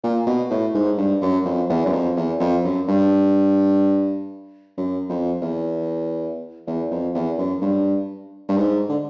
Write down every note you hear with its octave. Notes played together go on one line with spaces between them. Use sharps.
A#2
B2
A2
G#2
G2
F#2
F2
E2
F#2
F2
E2
F2
F#2
G2
F#2
F2
E2
E2
F2
E2
F#2
G2
G2
G#2
D3